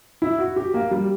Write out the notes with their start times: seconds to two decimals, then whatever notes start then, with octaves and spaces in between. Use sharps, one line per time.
0.22 E4
0.38 F#4
0.56 G4
0.74 A#3
0.91 G3